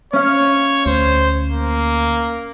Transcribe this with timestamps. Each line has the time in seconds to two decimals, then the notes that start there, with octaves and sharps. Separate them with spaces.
0.13 C#4 C#5 F5
0.86 D2 C5
1.51 A#3